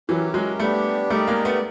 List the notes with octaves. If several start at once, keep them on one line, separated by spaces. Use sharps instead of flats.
E3 F#3 C#4 E4 G4 A#4
F#3 G#3
G3 A3 B3 D4 G4
G3 A3 D#4 G4 A#4 D5
G#3 A#3
A3 B3